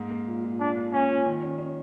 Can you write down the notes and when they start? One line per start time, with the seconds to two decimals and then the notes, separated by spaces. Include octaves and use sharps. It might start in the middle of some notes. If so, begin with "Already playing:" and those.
Already playing: G#2 A#3
0.11 A#3
0.27 A#2
0.44 A#2
0.60 A#2 D4
0.77 A#3
0.92 A#3 C#4
1.09 F3
1.26 D#3
1.43 C#4
1.58 C#4